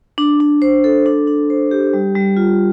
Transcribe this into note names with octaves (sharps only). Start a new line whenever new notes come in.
D4
D4
C5
A4
D4
D4
C5
G4
G3
G3
F4